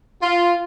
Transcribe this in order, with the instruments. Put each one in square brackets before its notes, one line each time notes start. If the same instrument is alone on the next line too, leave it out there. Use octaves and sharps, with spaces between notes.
[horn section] F4